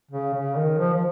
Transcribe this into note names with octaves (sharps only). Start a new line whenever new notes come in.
C#3
C#3
D#3
F3
F3